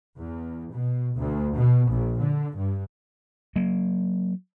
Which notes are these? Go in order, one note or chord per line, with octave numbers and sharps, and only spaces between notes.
E2
B2
D2
B2
A#1
D3
G2
F#3 A#3